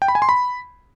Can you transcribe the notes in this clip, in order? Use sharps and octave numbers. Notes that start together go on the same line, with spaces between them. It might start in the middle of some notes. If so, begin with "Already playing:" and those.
G5
B5
G#5
C6
B5